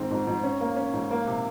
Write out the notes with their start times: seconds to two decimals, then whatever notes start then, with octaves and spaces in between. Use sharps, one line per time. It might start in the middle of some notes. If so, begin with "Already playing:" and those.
Already playing: G#2 D#3 C4
0.11 G#2
0.27 G#2
0.44 C#4
0.61 A#3
0.76 C#4
0.93 G#2
1.11 A#3
1.27 C3